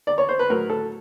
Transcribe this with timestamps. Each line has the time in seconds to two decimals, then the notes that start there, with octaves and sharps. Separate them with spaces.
0.07 D5
0.18 C#5
0.29 C5
0.39 B4
0.50 A2 F#3 A#4
0.70 A4